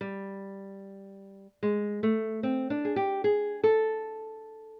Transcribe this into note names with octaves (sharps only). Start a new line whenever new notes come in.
G3
G#3
A3
C4
D4
G#4
G4
G#4
A4